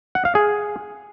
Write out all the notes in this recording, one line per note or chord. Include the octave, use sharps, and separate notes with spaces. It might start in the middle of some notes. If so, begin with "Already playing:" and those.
F#5
F5
G#4